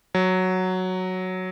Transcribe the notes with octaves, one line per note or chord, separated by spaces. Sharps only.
F#3